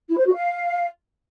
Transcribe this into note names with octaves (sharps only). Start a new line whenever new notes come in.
E4
C5
F#4
F5